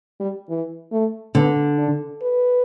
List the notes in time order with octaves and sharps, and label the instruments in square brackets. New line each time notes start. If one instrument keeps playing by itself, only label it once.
[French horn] G3
E3
A3
[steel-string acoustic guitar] D3 [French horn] B3
[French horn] D4
B4